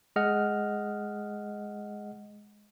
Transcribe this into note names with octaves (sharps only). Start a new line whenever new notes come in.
G#3 G#4 D#5 F#5 F6